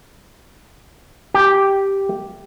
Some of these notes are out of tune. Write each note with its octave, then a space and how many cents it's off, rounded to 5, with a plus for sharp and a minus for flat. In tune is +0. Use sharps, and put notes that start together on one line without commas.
G4 +0 A5 +5